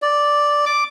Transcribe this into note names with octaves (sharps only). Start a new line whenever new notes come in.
D5
D6